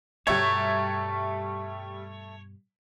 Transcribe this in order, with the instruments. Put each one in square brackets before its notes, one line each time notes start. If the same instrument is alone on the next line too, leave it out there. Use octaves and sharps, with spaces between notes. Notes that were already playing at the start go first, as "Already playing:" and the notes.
[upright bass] G2 B2 [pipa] F#3 A3 [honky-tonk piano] G3 E5 G#6 [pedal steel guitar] C#5